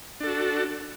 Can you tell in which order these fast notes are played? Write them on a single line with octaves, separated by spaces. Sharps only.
D4 A4 F#4